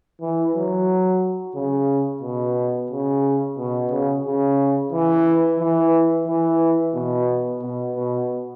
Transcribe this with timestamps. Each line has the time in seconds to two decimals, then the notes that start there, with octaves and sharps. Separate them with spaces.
0.21 E3
0.55 F#3
1.55 C#3
2.23 B2
2.91 C#3
3.58 B2
3.91 C#3
4.26 C#3
4.93 E3
5.60 E3
6.28 E3
6.95 B2
7.62 B2
7.96 B2